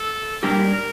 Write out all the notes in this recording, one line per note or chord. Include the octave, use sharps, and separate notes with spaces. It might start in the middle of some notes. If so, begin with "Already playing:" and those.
Already playing: A4
A#2 G3 D4 G4 A#4
A#4